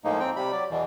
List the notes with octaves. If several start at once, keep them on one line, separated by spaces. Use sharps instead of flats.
A2 F3 G#3 A#3 D#4
C4 G5
C3 G3 B5
F#3 D5
E2 B2 E3